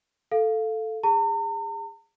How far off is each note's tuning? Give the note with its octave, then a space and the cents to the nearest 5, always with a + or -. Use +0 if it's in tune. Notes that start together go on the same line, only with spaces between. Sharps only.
A4 +0 F5 +0
G#4 -30 A#5 -45